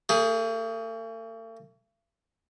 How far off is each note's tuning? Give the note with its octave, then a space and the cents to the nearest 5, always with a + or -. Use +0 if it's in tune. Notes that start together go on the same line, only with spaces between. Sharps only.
A3 +45 G#4 +0